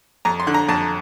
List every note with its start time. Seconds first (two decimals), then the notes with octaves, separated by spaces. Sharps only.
0.25 F2 A#5
0.40 C6
0.47 D3
0.54 A#5
0.69 F2 A5